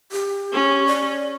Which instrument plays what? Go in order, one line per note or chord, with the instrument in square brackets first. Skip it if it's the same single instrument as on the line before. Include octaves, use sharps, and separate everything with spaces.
[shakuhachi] G4
[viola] C#4
[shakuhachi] D5